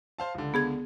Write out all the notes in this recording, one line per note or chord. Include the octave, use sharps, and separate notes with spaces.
C5 F5 A5
C#2 D3
B3 G#4 G#6